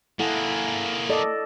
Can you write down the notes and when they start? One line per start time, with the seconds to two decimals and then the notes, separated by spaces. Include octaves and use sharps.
0.19 A#3 E4 G#4 A4 F#5
1.09 A4 D5 D#5